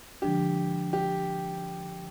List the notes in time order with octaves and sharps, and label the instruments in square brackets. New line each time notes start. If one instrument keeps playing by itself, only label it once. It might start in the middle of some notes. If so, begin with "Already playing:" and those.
[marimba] D3 F3 G#3 D4 [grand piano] G4
[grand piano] G4